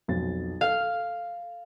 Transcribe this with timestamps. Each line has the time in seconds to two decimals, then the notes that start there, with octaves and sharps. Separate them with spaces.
0.08 B1 F2 A6
0.61 A4 F5